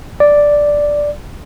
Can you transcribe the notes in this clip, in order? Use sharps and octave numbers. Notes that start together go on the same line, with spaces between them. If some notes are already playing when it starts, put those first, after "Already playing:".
D5